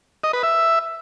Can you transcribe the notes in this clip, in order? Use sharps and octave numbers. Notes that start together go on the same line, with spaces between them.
D#5
B4
E5